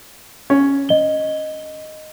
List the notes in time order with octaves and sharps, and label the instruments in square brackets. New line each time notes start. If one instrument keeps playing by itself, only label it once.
[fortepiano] C#4
[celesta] D#5 G7